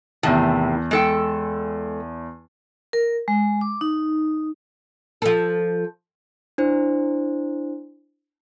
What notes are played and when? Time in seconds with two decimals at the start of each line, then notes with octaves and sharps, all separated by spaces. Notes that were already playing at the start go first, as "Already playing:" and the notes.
0.23 E2 A2 C3 D#3 A5
0.91 G#3 A4 G5
2.93 A#4
3.28 G#3
3.61 D6
3.81 D#4
5.22 F3 A4
6.58 D4 E4 C5